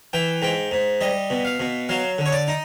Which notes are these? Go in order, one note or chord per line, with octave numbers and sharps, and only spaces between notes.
E3 G5
G#2 G5
G#2
G3 D#5
B2
F5
B2
F#3 F5
D3
C#5
D5
D#4